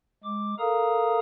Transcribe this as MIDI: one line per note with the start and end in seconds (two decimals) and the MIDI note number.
0.24 0.55 56
0.24 0.55 86
0.59 1.19 69
0.59 1.19 70
0.59 1.19 77
0.59 1.19 82
0.59 1.19 87